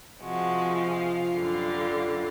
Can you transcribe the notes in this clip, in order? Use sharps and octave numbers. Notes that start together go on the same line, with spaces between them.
C3 F3 G#3 F#4
F4
F#2 D3 G3